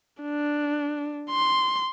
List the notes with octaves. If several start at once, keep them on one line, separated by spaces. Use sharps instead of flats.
D4
C6